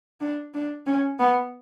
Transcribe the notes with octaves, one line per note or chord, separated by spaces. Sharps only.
D4
D4
C#4
B3